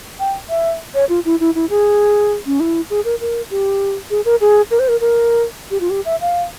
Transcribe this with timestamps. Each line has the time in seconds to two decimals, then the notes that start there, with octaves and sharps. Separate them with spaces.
0.19 G5
0.49 E5
0.94 C#5
1.09 F4
1.25 E4
1.40 E4
1.55 E4
1.70 G#4
2.46 C#4
2.60 E4
2.90 G#4
3.05 A#4
3.21 A#4
3.50 G4
4.10 G#4
4.25 A#4
4.41 G#4
4.71 A#4
4.79 C5
4.88 A#4
5.01 A#4
5.71 G4
5.80 F4
5.90 G4
6.05 E5
6.21 F5